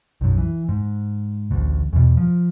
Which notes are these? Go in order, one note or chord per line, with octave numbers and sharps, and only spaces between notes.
B1 F#2
E3
G#2
A1 D2
E2 B2
F3